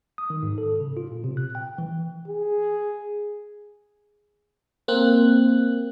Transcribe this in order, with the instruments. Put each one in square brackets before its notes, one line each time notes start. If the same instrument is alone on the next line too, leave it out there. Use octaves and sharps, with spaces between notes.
[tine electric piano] D#6
D#3
G#2
A4
C#3
F4
A#2
C3
F#6
G5
E3
[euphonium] G#4
[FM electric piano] A#3 C4 F#6